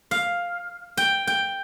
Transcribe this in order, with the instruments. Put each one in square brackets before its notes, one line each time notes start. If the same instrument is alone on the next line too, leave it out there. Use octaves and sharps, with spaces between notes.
[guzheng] F5
G5
G5